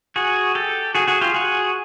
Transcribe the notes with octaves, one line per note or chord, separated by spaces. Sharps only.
F#4 G#4
G4 A4
F#4 G#4
F#4 G#4
F4 G4
F#4 G#4